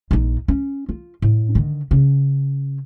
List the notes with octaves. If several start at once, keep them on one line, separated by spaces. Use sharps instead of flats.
A#1 D#4
C#4
F4
A2
D3 D#3
C#3 C#4